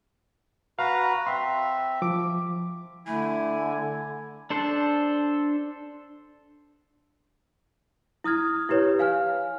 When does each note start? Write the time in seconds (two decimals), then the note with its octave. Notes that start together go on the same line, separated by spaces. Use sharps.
0.79 F#4 B4 F5 A#5
1.26 C4 E5 C6
2.02 F3 D6
3.07 D3 A3 E4 G#5
4.50 D4 A4 C5
8.24 E4 D#6 F6 G#6
8.69 E4 G4 B4 C#5
8.99 F5 G#5 F6